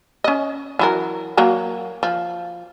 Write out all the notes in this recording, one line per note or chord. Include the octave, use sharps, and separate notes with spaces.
C#4 D#5
E3 F#3 A#4
F#3 A#3 A#5
F3